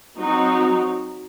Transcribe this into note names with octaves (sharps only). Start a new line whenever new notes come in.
F#3 C4 D#4 F#4